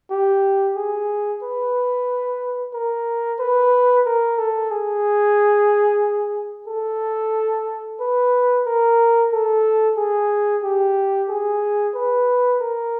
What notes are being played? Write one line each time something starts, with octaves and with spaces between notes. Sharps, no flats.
G4
G#4
B4
A#4
B4
A#4
A4
G#4
A4
B4
A#4
A4
G#4
G4
G#4
B4
A#4